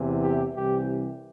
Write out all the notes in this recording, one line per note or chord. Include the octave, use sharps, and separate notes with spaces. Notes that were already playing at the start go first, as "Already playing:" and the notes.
Already playing: E2 C3 E3
G4
C2 C3 E3 G4